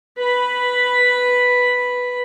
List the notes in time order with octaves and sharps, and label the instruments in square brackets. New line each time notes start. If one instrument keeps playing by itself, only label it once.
[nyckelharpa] B4 B5